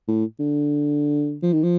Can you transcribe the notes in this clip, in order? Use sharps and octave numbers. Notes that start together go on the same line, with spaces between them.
A2
D3
F3
D#3
F3